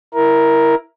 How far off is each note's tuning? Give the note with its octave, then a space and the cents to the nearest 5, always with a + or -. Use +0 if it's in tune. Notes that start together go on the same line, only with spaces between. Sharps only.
E4 +0 A#4 +10